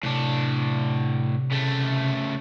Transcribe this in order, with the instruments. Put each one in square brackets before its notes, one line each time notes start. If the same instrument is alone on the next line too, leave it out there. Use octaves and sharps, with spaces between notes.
[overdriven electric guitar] A2 D4 [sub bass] C3
[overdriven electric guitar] C#3 A3